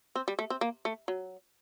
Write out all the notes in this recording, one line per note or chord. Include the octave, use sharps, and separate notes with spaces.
C4
G3
A3
C4
A#3
A3
F#3